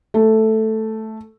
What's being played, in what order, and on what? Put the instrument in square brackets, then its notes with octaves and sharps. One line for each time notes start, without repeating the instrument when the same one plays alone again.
[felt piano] A3